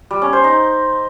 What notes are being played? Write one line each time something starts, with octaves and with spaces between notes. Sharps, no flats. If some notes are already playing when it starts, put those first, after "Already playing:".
G3
C#4
C5
D#4